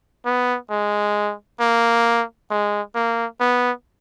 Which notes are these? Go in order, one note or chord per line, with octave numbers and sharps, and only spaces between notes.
B3
G#3
A#3
G#3
A#3
B3